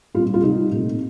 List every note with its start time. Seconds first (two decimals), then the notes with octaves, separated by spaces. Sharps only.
0.15 A#2 G3 C4 F4
0.34 F4
0.43 C3 G3 C4 D#4
0.71 A#2 A3 C4